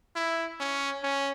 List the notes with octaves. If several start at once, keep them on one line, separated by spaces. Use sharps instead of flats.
E4
C#4
C#4